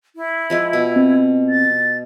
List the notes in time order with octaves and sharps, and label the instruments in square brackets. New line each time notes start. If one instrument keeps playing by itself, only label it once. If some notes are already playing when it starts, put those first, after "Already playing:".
[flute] E4
[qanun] F3 G#3 F4
B2
[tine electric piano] C4
[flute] A6